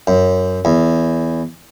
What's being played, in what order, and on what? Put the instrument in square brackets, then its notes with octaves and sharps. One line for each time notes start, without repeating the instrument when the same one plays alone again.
[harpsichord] F#2
E2